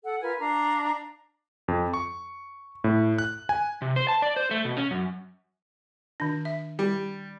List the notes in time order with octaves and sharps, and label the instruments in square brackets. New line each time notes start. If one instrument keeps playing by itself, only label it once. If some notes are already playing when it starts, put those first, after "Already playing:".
[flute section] A4 F#5
F4 A#4 B4 G#5
D4 F5 A#5
[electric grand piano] F2
C#6
A2
F#6
G#5
[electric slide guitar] C3
C5
A5
D5
C5
A3
B2
C#4
F#2
[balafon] D#3 D4
E5
[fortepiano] G3